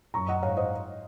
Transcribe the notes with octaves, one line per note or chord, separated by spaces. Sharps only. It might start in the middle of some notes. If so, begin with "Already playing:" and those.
F#2 A#5 C#6
D#5 F#5
G#2 C#5 F5
C5 D#5